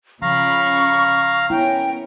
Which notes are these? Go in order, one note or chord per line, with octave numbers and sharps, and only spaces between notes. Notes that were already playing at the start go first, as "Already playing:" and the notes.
C#3 F3 F5 A#5 B5 C#6
B3 C#4 E4 A#4 G5